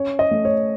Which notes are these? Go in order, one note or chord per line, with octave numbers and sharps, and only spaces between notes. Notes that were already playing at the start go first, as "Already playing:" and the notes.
Already playing: C#4 C#5
D#5
A3
C#5